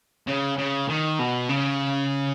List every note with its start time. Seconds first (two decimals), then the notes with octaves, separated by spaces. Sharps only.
0.27 C#3
0.58 C#3
0.89 D#3
1.19 B2
1.49 C#3